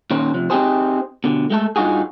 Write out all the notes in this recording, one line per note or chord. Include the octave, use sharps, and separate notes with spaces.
A#2 D#3 C#4 C5
C3 F3
C4 D#4 F4 G4 G#4 C5
B2 D3
G#3 A3 A4
G2 D#4 F4 F#4 G#4